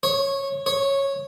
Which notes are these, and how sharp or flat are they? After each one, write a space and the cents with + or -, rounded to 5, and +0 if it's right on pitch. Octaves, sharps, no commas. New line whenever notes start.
C#5 -15
C#5 -10